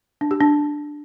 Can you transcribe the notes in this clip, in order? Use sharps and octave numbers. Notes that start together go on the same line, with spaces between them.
D4
G4
D4